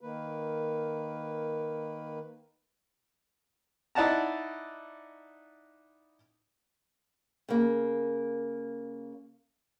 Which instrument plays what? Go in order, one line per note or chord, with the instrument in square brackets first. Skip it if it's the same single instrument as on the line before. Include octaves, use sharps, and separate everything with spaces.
[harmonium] D#3 A#3 B4
[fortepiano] D#4 E4 D5 F#5 A5 A#5
[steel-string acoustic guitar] C#3 A#3